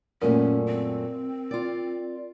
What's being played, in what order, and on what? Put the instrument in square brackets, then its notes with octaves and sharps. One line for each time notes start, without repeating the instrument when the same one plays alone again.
[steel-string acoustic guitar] F#2 A#2 A3 [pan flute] C#4 [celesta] A#4
[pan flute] C4
[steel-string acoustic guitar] F4 D5